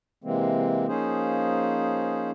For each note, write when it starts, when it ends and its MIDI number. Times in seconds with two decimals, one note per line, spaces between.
0.24 0.87 48
0.24 0.87 52
0.24 0.87 56
0.24 0.87 58
0.24 0.87 60
0.88 2.31 53
0.88 2.31 58
0.88 2.31 61
0.88 2.31 63
0.88 2.31 68
0.88 2.31 72